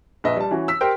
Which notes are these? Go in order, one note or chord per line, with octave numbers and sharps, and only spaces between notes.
A#1 B4 D#5 E5
G3 A5
E3 C#4 F#4
E6 B6
G4 A#4 C5 G5